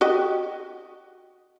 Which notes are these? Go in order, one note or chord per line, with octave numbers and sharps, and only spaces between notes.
F#4 G4 D#5